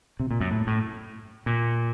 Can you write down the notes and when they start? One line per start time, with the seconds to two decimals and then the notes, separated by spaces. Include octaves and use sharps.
0.20 C3
0.31 A#2
0.40 F#2
0.51 A2
0.67 A2
1.46 A#2